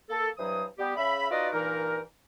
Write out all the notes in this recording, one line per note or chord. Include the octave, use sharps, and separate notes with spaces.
A#3 A4
G2 E3 F#3 C5 D#6
G3 B3 G4
C#3 E5 B5
D#4 F4 F#4 B4 D5 D#5
G2 A#2 E3 D#4 A#4